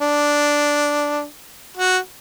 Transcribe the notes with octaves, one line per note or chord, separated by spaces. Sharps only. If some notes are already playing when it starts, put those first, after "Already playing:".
D4
F#4